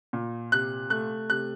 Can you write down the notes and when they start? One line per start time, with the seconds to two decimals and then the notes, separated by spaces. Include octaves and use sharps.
0.13 A#2
0.52 C3 F#6
0.90 A3 F#6
1.30 C3 F#6